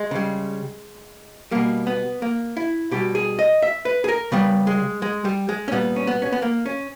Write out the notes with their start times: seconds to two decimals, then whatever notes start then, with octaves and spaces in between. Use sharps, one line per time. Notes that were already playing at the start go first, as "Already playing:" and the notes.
Already playing: G#3
0.11 C#3 G3
1.51 B2 G3 A#3
1.87 B3
2.22 A#3
2.57 E4
2.91 B2 G3 G4
3.15 G#4
3.39 D#5
3.62 E5
3.85 B4
4.04 G#4
4.08 A#4
4.32 C#3 G3 B3
4.67 G#3
5.02 G#3
5.25 G3
5.49 G#3
5.68 C#4
5.72 A#2 G3 B3
5.96 C#4
6.07 B3
6.22 C#4
6.32 B3
6.42 A#3
6.66 C#4